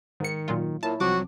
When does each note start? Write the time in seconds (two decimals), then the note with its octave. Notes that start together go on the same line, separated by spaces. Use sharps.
0.20 G#2 D#3 C#7
0.48 A#2 F#3 F4
0.83 A#2 E4 C#5 A5
1.00 C2 F3 F#3 C4 F#4 D6